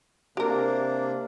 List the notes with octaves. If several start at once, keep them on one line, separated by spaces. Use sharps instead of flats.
C3 A#3 D4 G4 A#4